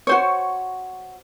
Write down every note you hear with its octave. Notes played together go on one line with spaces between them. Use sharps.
F#4 C5 C#5